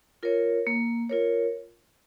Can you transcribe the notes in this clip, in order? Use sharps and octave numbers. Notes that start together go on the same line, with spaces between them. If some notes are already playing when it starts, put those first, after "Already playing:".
F4 A#4 C#5
A#3
F4 A#4 C#5